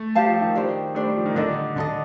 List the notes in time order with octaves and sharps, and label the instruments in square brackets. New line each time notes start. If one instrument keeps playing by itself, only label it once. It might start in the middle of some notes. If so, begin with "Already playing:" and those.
Already playing: [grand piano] A3
[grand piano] G3 [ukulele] G4 C5 F5 A5
[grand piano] F3
D#3
[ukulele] D4 G4 C5
[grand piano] A3 [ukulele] D4 G4 C5
[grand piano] G3
F3
D#3
[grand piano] D3 [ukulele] D4 A4 D#5
[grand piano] D3 [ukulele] D4 A4 D#5